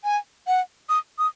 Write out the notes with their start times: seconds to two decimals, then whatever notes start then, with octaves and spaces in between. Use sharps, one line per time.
0.04 G#5
0.47 F#5
0.89 D#6
1.18 D#6